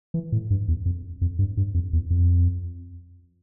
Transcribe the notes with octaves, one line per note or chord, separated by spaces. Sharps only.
E3
A2
G2
E2
F2
F2
G2
G2
F2
E2
F2